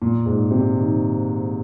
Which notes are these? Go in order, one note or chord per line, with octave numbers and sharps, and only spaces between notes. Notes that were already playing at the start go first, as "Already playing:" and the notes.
A#2
G#2
C3
D#3